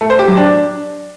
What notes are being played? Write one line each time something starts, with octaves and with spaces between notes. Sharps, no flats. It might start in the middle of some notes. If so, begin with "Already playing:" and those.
A3
C5
G4
F#3
D4